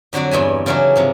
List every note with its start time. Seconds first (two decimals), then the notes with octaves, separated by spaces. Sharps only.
0.13 F2 D3 F#3 F#4 D5
0.31 E2 G2 E5 G#5
0.66 C#3 E3 F#3 C#4 D4
0.96 G#2 C3 F3